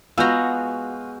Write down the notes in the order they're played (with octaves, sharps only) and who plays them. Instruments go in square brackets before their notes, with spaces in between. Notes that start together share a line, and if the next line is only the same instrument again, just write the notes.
[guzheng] G#3 F#4 [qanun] B3 A#5 [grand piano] F4 [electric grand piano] E6 F6 G6